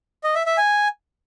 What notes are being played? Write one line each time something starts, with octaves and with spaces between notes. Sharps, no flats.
D#5
E5
E5
G#5